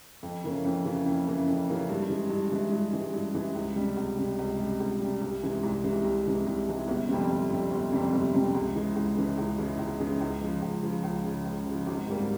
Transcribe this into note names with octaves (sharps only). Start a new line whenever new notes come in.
F2
C#3 E3 A#3 C#4
F2
C#3 E3 A#3 C#4
F2
C#3 E3 A#3 C#4
F2
C#3 E3 A#3 C#4
G2
E3 G#3
G2
E3 G#3
G2
E3 G#3
G2
E3 G#3
C#2
C3 G3
C#2
C3 G3
C#2
C3 G3
C#2
C3 G3
C2
C3 E3 G#3
C2
C3 E3 G#3
C2
C3 E3 G#3
C2
C3 E3 G#3
G1
F2 C3 G3 C4
G1
F2 C3 G3 C4
G1
F2 C3 G3 C4
G1
F2 C3 G3 C4
C#2
C#3 E3 G#3
C#2
C#3 E3 G#3
C#2
C#3 E3 G#3
C#2
C#3 E3 G#3
C#2
C#3 F3
C#2
C#3 F3
C#2
C#3 F3
C#2
C#3 F3
G#1
G#2 G3 A#3